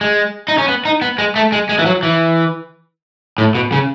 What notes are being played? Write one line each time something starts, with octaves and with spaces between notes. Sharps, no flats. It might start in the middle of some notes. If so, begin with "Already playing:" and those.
G#3
D#4
C#4
B3
D#4
B3
G#3
A3
G#3
G#3
E3
F#3
E3
A2
B2
C#3